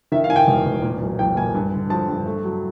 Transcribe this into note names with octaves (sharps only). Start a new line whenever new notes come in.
D#3 E5
F5
D#3 G#5
G5
E1
E1
A#2
B1
B1 G5
A#2 G#5
G2
D3
F3 A5
G2
A3
F#3